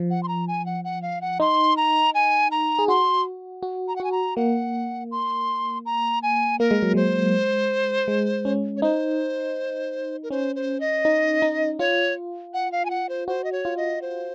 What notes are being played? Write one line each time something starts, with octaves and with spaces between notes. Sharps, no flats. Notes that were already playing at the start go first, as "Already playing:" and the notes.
Already playing: F3
F#5
C6
A#5
G#5
F#5
F#5
F5
F#5
D#4 C6
A#5
G#5
A#5
G#4
F#4 C6
F#4
A#5
F#5
F#4 G#5
A#5
A#3 F#5
C6
A#5
G#5
A#3 A#4
G#3
F#3
G#3 C5
G#3
C#4
C#5
D#4 C5
A#4
C#4 C5
C5
D#5
D#4
D#4
F4 C#5
F#5
F5
G#5
F#5
C5
F#4 C5
D#5
C#5
F4
D#5
C5